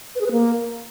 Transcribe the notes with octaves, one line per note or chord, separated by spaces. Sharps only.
B4
G#4
B4
A#3